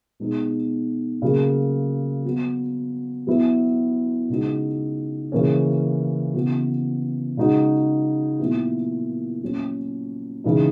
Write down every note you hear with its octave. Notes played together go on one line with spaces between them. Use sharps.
B2 G#3 B3 D#4
C#3 F#3 A#3
F#3 B3 F#4
F#3 B3 E4
C#3 G#3 D#4 F#4
C#3 E3 A#3 C#4
C#3 E3 B3 F#4
C#3 G#3 D#4 F#4
A#2 F#3 B3 E4
A#2 F#3 C#4
C#3 E3 G#3 D#4